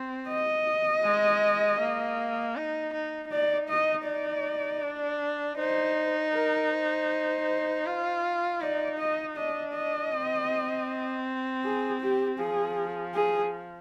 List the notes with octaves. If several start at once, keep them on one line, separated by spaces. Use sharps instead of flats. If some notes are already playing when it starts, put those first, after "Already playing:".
Already playing: C4
D#5
G#3
A#3
D#4
D#4
D#4 D5
D#5
D5
D4
D#4 C5
A#4
C5
F4
D#4 D5
D#5
D4 D#5
D#5
C4
G#4
G4
F3 G#4
G#4